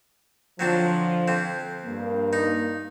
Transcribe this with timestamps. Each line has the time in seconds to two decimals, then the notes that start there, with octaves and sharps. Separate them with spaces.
0.59 D3 F3 F#3 C4 D4
1.28 F2 C4
1.85 G2 A#3
2.33 D#4